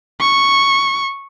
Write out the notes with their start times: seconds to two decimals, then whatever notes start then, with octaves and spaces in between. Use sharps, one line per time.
0.20 C#6